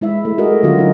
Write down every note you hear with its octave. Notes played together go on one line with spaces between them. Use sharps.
G#3 E4 E5
A3
F#4 G#4 A#4 D#5
D3 F#3 C#4 F4 F#4 A#4
D#4 F4